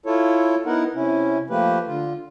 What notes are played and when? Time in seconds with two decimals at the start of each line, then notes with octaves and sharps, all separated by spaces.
0.06 E4 F4 A4 C#5
0.66 B3 D#4 E4 A#4 F#5
0.95 C3 C#4 E4
1.50 F3 A3 A#3 G4 B4
1.87 D3 F4